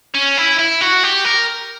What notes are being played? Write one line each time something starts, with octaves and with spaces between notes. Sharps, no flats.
C#4
E4
E4
F#4
G4
A#4